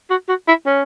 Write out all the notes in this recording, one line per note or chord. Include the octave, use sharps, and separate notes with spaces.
F#4
F#4
E4
C#4